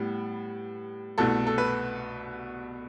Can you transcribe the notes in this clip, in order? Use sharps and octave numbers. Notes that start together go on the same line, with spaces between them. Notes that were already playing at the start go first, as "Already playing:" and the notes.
Already playing: A2 G3 B3
C2 B2 A3 A4
A4
B4